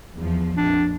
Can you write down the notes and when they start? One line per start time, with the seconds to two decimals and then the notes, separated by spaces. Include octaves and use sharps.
0.16 E2 F3
0.57 A#1 F2 D4